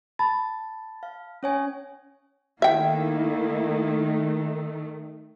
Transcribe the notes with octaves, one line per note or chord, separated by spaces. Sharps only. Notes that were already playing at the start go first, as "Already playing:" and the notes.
A5 B5 A6
F5
C#4 C#5 G#5
D#3 A3 A#3 E4 E5 G5